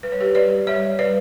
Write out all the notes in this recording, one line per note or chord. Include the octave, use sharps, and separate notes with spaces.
G3 B4
C#5
G4 B4
G3 B4 D5
G3 C#5 E5
G3 B4 D5